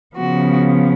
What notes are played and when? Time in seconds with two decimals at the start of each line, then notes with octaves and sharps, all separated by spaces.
0.15 C#3 F3 B3 F#4